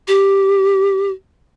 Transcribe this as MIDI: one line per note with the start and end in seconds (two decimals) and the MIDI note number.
0.08 1.11 67